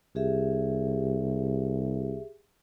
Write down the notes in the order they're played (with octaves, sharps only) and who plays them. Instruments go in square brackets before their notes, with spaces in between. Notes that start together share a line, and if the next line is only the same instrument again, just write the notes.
[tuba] C2 [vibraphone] G4 G#4 E5